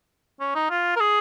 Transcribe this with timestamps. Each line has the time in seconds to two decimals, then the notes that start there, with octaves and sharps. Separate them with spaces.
0.40 C#4
0.55 D#4
0.70 F4
0.96 A#4
1.00 G#4